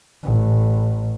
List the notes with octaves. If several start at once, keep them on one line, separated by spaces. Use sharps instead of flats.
A1